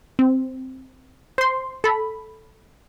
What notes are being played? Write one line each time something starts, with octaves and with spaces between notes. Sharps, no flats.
C4
C5 C6
A4 B5